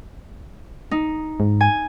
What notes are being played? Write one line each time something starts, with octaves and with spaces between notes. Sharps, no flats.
D#4
G#2
G#5